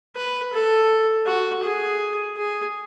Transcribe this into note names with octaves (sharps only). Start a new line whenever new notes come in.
B4
A4
F#4
G#4
G#4